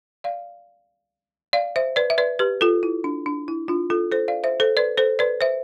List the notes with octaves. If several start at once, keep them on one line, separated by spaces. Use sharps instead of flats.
D5 F5
D5 F5
C5 E5
B4 D5
E5
B4 D5
G4 B4
F4 A4
E4
D4
D4
E4
D4 F4
F4 A4
A4 C5
D5 F5
C5 E5
A4 C5
B4 D5
A4 C5
B4 D5
C5 E5